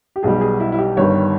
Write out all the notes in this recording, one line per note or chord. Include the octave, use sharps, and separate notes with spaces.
G4
B1 B2 G3 G#4
G#4
E4
E4
G4
G1 G2 D#3 G3 C#5